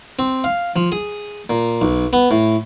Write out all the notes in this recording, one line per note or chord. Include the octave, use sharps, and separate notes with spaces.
C4
F5
F3
G#4
A#2
B1
B3
A2